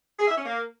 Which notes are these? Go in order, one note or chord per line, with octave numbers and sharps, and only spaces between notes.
G#4
E5
C#4
A#3